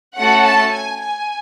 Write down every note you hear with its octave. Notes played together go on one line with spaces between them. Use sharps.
A3 C#4 F#4 A4 F#5
A5
G#5
G#5